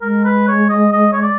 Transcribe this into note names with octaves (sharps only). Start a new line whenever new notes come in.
G#3 A#4
B4
C#5
D#5
D#5
C#5
D5